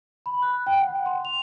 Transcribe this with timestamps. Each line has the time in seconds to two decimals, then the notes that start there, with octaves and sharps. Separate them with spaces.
0.26 B5
0.42 F#6
0.67 G5
0.81 F#5
1.06 C6
1.25 F7